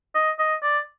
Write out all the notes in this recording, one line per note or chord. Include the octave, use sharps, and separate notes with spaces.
D#5
D#5
D5